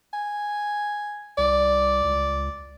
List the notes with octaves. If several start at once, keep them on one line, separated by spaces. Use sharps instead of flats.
G#5
C2 D5
C#2